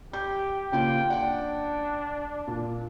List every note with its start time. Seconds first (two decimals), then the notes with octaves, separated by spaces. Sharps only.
0.13 G4 G6
0.72 C#3 A#3 F4 G5
1.10 D4 F#5 G5
2.47 A#2